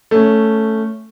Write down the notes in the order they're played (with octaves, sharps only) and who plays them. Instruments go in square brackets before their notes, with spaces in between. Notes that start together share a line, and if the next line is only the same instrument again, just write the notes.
[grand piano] A3 C#4